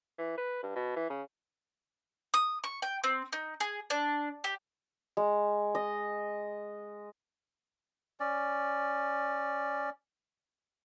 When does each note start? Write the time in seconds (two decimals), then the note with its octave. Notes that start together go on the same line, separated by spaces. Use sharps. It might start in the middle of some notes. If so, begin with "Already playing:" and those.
0.18 E3
0.38 B4
0.63 G2
0.76 B2
0.96 E3
1.10 C#3
2.34 D#6
2.64 C#6
2.82 G5
3.04 C4
3.33 D#4
3.60 G#4
3.90 D4
4.44 G4
5.17 G#3
5.75 D#5
8.20 C#4 D5